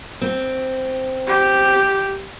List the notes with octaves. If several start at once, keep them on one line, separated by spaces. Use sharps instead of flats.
C4
G4